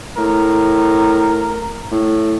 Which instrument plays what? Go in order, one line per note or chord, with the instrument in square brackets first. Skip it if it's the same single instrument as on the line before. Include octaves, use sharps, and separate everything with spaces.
[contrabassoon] A2 [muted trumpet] A#4
[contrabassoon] A2